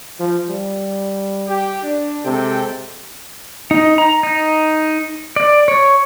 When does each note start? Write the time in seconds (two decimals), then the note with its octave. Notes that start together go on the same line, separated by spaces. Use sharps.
0.20 F3
0.49 G3
1.48 G4
1.83 D4
2.25 C3 G#3 A4 G5
3.71 D#4
3.98 A#5
4.23 D#4
5.36 D5
5.68 C#5